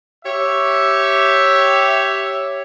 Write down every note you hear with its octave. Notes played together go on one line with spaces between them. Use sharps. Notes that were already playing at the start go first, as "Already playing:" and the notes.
G4 C#5 E5